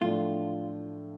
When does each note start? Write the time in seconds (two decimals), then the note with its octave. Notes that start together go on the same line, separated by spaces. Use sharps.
0.01 A2 F3 A3 D4 F4